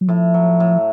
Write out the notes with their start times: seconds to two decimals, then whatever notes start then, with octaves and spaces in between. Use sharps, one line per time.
0.01 F#3
0.08 A2 F3
0.34 F#3
0.60 A2